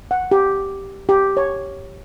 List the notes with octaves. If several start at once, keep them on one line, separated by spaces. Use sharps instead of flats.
F#5
G4
G4
C#5